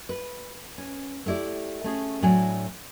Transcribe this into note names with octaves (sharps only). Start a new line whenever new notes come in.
B4
C#4
A3 B3 E4 G4 D5
A3 C#4 G#4
A2 F#3 A3 D4 C#5 G#5